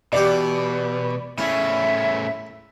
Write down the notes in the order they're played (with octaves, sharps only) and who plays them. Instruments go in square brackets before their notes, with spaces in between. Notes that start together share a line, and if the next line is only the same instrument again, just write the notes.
[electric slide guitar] B2 [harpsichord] E3 G4 [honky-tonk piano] D5
[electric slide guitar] A2 C#4 G#4 [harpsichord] E4 [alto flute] E5